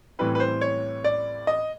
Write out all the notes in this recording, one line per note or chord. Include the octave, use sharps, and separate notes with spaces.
A2 E3 G3 C4 B4
B4
C5
C#5
D5
D#5